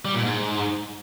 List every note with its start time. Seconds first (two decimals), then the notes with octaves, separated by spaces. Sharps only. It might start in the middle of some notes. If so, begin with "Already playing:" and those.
0.05 G3
0.14 A#2
0.24 G#2